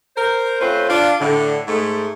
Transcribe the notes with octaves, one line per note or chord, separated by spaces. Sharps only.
A#4 C5
A3 C4 C#4 F4 B4 C5
D4 F4
A2 D3
G#2 A3